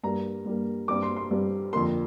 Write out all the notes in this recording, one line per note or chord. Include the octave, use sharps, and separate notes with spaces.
G2 G3 A#3 A#5
G2 G3 A#3
G2 G3 C4 D6
C6
C6
G2 G3 C4
F2 D3 A#3 C6